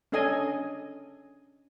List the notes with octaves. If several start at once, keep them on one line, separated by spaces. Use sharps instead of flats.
C#4 D4 A4 D#5 G#5